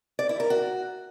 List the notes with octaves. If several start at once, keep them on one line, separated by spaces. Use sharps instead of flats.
D5
E4
A#4
F#4